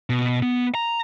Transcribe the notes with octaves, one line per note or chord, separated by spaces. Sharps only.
B2
B3
A#5